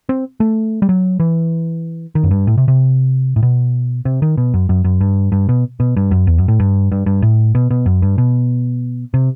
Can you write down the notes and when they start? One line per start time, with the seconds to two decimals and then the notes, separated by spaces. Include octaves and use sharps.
0.09 C4
0.40 A3
0.82 G3
0.89 F#3
1.20 E3
2.15 D#3
2.23 F#2
2.31 G2
2.47 A2
2.58 C3
2.68 C3
3.36 A2
3.43 B2
4.05 C3
4.22 D#3
4.37 B2
4.54 F#2
4.69 F#2
4.84 F#2
5.01 G2
5.32 G2
5.49 B2
5.80 B2
5.97 G2
6.11 F#2
6.27 E2
6.38 F#2
6.48 A2
6.60 G2
6.92 G2
7.06 G2
7.22 A2
7.55 B2
7.70 B2
7.86 F#2
8.02 G2
8.18 B2
9.14 C3